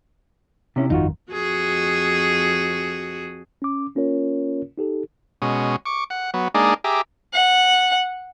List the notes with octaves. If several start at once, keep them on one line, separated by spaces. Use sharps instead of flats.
C3 C#4 E4
G1 F2 D#3 D#4 F4 F#4
F2 F#4 G#4
C#4 D6
A#3 C#4 F4 A#4 C#5
D#4 G4 A4
B2 G#3 C#4
C#6 D6
F#5
F#3 B3
G#3 A#3 D4 D#4 G#4 D5
G4 G#4 E5 A#5 D6
F#5